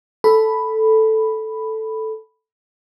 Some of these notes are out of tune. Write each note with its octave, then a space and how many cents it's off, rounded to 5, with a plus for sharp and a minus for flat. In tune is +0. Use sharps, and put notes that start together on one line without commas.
A4 +0 B5 +0